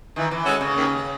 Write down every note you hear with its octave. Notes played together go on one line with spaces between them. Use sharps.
D#3 E3
E3
G#3 C#4 F#4 A4
C#3
D#2